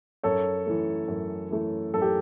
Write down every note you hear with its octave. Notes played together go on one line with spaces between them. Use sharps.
F#2 A4 C#5
E3 A3
F#2
E3 A3
F#2 A4
G4